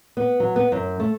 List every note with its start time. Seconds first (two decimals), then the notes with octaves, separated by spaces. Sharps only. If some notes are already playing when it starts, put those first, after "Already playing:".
0.17 B3
0.40 F#3
0.56 B3
0.72 F#2
1.00 A3